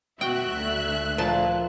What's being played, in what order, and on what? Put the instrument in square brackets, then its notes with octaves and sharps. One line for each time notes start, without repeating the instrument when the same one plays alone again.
[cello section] B2 F#4 [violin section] E5 F#6 [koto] G5
[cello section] D2 A3
[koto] A#2 F3 A5